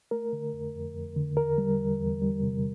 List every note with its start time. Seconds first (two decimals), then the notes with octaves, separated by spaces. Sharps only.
0.11 A3 A#4
0.33 D3
0.53 F2
0.75 F2
0.95 F2
1.16 D3
1.37 E2 A#4
1.58 G3
1.79 E2
2.00 E2
2.22 G3
2.43 C3